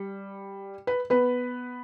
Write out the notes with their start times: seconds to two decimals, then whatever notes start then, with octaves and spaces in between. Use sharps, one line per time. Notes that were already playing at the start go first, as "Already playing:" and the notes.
Already playing: G3
0.87 B4
1.10 B3 B4